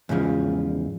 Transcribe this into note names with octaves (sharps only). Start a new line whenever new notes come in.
E2 G#2 C#3 F3